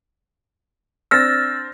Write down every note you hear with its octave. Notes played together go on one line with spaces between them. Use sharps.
C4 D4 E6 F6 A6 A#6